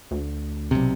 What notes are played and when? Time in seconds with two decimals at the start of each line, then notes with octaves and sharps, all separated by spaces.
0.11 D2
0.71 B1 C3